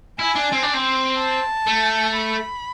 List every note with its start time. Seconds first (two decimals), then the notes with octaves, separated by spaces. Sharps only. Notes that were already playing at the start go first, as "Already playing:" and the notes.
0.19 E4 G#5
0.36 D4
0.52 C4
0.63 D4
0.74 C4
1.18 A5
1.67 A3
2.16 B5